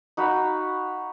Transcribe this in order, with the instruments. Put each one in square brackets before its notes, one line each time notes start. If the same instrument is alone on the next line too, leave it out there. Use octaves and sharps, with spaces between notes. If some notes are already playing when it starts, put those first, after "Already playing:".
[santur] D#4 F#4 F5 B5